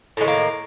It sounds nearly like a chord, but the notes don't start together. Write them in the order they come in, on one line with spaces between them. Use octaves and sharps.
A2 G#3 D#3 A#3